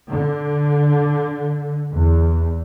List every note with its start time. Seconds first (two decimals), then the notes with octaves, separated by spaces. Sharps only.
0.11 D3
1.90 E2